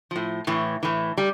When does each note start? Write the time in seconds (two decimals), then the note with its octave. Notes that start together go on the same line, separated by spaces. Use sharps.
0.11 A2 F3
0.47 A2 E3
0.83 A2 E3
1.18 G3